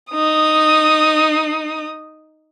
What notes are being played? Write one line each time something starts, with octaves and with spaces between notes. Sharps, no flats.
D#4 D#6